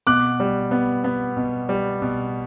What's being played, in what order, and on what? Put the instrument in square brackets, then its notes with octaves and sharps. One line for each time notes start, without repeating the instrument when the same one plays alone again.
[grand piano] B2 D6 F#6
G3
B3
B3
B2
G3
B2